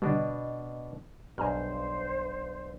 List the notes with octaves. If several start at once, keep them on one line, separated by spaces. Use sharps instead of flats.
B2 D3 G3 D4 D#5
B1 G2 C5 G#5 A#5 F6